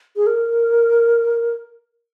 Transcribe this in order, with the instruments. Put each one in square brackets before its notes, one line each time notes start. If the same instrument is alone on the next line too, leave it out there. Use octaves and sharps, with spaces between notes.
[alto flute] G#4
A#4